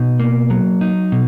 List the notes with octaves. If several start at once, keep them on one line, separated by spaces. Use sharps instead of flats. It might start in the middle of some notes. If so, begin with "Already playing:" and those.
Already playing: B2 D#4
A#3
F#3
D#4
B2